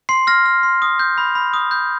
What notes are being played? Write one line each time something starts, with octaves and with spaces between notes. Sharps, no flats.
C6 C7
F6 A#6
F6
C6
D#6
G6
B5
B5
D#6
G6